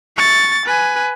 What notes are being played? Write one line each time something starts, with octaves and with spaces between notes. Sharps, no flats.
C#6 A6
B4 G#5